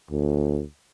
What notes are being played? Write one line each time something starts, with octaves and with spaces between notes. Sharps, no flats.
D2